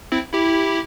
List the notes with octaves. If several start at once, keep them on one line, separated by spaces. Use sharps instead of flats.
C4 E4
E4 G4